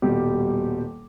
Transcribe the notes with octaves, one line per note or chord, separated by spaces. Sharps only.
D#1 B2 G3 G4